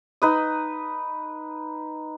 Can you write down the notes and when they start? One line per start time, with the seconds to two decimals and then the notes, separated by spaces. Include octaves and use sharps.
0.22 D#4 B4 D#6